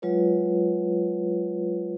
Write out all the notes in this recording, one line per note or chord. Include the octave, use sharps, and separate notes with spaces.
F#3 G#3 F4 B4 C#5